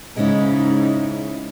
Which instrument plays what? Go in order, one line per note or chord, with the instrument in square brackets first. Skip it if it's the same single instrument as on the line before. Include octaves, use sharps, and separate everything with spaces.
[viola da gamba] G#2 C#3 D#4 [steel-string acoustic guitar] G#3 C#4 E4